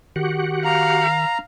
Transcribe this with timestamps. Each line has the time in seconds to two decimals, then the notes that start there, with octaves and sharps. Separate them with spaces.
0.16 D#3 F#4 G4 F#5
0.65 F5 A#5